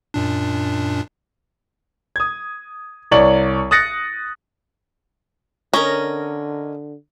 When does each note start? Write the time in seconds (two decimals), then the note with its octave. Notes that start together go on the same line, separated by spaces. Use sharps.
0.14 F#2 A#2 D4
2.16 D#6 G#6
3.11 C2 C#5 D5 F#7
3.71 D#6 F#6 A6 A#6 C#7
5.74 D3 C#4 A#4 D#5 A#5